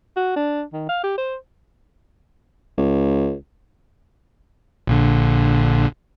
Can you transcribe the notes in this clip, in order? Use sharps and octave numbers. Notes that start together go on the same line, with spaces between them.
F#4
D4
D#3
F5
G4
C5
C#2
A#1 A#2 D3